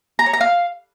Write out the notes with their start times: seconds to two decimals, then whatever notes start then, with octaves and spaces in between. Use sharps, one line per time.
0.19 A#5
0.26 C#5
0.33 A#5
0.41 F5